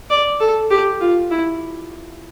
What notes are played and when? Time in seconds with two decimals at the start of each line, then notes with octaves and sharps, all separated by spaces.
0.10 D5
0.40 A4
0.70 G4
1.01 F4
1.31 E4